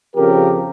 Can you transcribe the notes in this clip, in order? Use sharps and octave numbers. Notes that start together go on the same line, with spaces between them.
F2 C#3 F3 G4 A#4